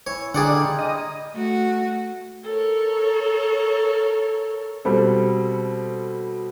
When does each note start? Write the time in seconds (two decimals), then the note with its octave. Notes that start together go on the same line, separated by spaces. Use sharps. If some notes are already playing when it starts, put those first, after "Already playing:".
0.07 E3 C#5
0.34 D3 G3 G#3 A#3 G#4 D5 F#5
0.79 D#5
1.35 A3 F#4
2.45 A4 A#4 C#5
4.85 B2 G3 C4 A4